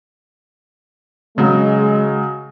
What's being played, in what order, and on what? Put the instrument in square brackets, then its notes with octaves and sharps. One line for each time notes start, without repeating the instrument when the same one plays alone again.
[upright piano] C#3 F#3 [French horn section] G#3